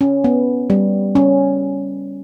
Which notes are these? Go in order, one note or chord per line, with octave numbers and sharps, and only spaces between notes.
C#4
B3
G3
C#4